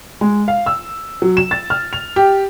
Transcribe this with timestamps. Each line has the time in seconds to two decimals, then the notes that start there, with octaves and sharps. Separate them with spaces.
0.21 G#3
0.48 F5
0.66 E6
1.22 F#3
1.37 E7
1.51 A6
1.70 F6
1.93 F7
2.16 G4